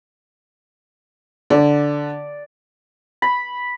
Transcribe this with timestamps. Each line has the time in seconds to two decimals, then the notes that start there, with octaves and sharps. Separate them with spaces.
1.50 D3 D5
3.22 B5